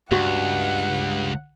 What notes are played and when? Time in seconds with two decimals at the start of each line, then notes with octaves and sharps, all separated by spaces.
0.11 C#2 G2 F#4 F#5